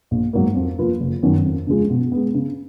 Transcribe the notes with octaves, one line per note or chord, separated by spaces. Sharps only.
A#1
G#2 F#3 A#3
F2
F3 A#3 F4 B4
F#1
F#2 D#3 F#3 C#4
F2
C#3 F3 G#3
B2
G#3 B3
C#3